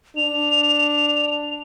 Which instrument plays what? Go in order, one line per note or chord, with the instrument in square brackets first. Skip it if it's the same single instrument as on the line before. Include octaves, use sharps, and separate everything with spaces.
[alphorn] D4 [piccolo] F7